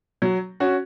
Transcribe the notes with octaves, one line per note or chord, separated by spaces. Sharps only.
F#3
C#4 F#4